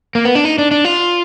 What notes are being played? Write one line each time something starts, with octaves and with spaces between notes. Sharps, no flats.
A#3
B3
D4
D#4
D4
D4
F4